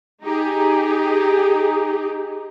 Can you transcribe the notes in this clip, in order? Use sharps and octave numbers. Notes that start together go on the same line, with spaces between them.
D#4 G4 G#4